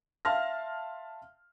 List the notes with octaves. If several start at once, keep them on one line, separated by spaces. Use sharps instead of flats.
E5 F5 A5 C6 F6 A#6